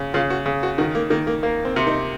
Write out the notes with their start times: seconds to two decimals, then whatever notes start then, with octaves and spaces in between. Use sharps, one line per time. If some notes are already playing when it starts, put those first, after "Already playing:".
Already playing: C#3
0.14 C#3 F4
0.30 F#4
0.46 C#3
0.63 F#4
0.78 D#3 F#4
0.95 A#3
1.10 D#3 A#3
1.27 A#3
1.43 A#3
1.65 C4
1.76 C3
1.87 D#4